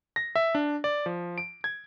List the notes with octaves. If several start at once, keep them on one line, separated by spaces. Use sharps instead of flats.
A#6
E5
D4
D5
F3
D7
G#6